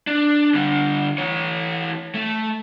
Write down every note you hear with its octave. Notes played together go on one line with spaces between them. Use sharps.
D4
D3 G3
E3 C#5
A3